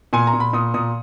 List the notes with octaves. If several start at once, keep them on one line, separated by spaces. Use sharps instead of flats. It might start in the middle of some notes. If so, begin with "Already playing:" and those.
A#2 G#5
A#5
A#2
B5
A#2 D#6
A#2 D#6